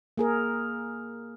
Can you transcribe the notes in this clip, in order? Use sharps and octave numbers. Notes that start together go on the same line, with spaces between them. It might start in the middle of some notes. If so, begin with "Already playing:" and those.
A#3 G#4 A#4